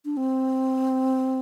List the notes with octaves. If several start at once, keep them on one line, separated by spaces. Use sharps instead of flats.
D4
C4